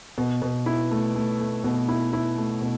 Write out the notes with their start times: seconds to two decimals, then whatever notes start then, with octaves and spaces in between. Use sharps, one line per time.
0.18 B2
0.42 B2
0.66 E4
0.91 A3
1.15 A3
1.40 A3
1.64 B2
1.88 E4
2.13 E4
2.38 A3
2.61 B2